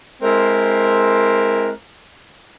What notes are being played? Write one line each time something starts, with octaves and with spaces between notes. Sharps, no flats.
G#3 C4 E4 A#4